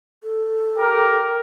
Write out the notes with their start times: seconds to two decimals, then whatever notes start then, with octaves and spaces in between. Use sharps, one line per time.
0.23 A4
0.77 G4 A#4